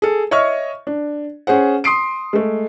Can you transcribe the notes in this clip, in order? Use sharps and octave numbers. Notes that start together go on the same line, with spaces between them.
G#4 A4
C#5 D#5 E5 C#6 F6
D4
C#4 G#4 C5 F#5
C6 D#6 C7 D7
G#3 A3